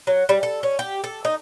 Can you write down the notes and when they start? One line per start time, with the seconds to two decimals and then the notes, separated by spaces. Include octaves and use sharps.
0.07 F#3
0.29 G3
0.43 A4
0.63 C#4
0.79 G4
1.04 A4
1.25 D#4